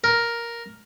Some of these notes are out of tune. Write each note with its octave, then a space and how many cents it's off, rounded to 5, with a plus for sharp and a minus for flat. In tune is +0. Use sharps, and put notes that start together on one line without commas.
A#4 +5